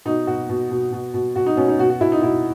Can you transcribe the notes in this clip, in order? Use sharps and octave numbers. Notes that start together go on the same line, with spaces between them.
B2 D#4
B2 F#4
B2
B2
B2
B2
B2 F#4
D#4
B2 C#4
D#4
B2 F#4
F#4
B2 E4
D#4
B2 E4